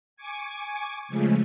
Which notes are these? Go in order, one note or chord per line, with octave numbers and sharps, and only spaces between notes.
G#5 C#6 D6
C#3 F3 G#3 A3